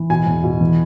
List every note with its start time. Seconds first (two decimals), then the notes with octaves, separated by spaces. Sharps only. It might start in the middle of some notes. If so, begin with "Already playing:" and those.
Already playing: E3
0.10 B2 G#5
0.26 E2
0.44 B2
0.61 E3